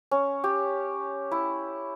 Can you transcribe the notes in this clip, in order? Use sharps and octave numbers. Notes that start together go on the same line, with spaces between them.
C#4
G4
E4